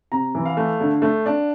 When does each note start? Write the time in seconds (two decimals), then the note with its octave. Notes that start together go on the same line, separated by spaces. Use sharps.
0.12 C3 A#5
0.35 E3
0.45 F5
0.57 A3
0.80 D3
1.02 A3
1.26 D4